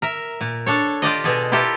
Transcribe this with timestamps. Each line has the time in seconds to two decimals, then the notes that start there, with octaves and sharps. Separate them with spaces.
0.02 A#4 E5
0.41 A#2
0.66 D4 A4 C#5
1.02 F4 G4 D5 D#5
1.24 B2 G#4 A4
1.52 E4 F4 G4 A4 A#4